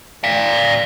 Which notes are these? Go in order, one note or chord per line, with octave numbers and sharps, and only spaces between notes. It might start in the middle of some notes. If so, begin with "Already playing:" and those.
D5 F5